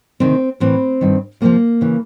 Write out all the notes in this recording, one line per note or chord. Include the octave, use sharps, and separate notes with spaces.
D2 C3 D#3 C4
A2 E3 C4
G2 D#3
F2 C3 F3 A#3
C#3 E3